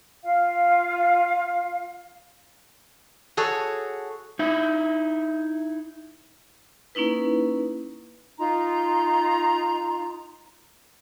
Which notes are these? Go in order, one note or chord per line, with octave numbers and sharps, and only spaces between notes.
F4 F5
F#4 G#4 A4 C#5
D#4 E4 E5
A#3 C#4 D#4 E4 B4
D#4 F4 A#5 C6